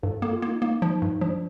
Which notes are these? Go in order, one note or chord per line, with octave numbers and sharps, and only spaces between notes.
G2 A4
A#3 A4
F4
A#3
D#4
A#3 D#4
F3
G2
F3 D4